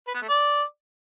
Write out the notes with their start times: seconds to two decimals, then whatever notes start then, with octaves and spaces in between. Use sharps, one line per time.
0.07 B4
0.14 B3
0.21 A3
0.28 D5